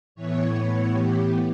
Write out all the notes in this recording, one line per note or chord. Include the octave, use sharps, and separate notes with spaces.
A2 E3 B3 C#5
G4